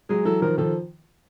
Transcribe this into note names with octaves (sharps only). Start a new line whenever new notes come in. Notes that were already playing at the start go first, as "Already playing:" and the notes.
F#3 G#3 G#4
E3 F#3 A4
D#3 F3 A#4
D#3 F3 A4